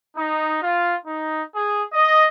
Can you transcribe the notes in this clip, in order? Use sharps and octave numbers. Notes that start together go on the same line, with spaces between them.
D#4
F4
D#4
G#4
D#5